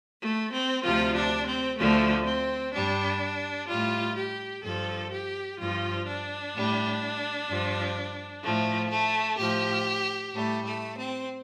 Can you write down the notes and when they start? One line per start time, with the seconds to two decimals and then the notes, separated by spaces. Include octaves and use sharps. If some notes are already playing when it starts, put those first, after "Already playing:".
0.21 A3
0.52 C4
0.83 D2 C3 F3 F4
1.15 D4
1.47 C4
1.79 D2 D3 F3 A3
2.26 C4
2.73 G2 G3 D4
3.68 A2 G3 F4
4.16 G4
4.64 G2 F3 A4
5.11 G4
5.59 G2 F3 F4
6.06 D4
6.54 A2 G3
7.48 G2 F3
8.44 A2 F3 A3
8.91 A3
9.39 A2 F3 G4
10.33 A2 G3 A3
10.65 A3
10.97 C4